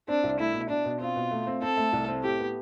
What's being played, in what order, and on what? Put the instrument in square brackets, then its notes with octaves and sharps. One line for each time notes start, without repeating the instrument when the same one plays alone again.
[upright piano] C4 [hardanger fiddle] D4
[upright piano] C2
[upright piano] A3 [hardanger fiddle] E4
[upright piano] B2
[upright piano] B2 [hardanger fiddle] D4
[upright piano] B2
[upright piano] C4 [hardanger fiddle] F4
[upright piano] B2
A3
C4
[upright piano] C4 [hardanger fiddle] A4
[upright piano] A3
C2
C4
[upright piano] A2 [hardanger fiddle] G4
[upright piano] B3